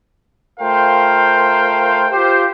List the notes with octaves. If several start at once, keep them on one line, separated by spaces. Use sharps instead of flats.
A3 F4 A#4 C5 F5 G5
F4 G4 C5